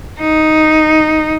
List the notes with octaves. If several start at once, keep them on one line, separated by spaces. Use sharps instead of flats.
D#4